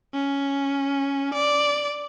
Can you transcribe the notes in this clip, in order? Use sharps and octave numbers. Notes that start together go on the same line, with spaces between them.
C#4
D5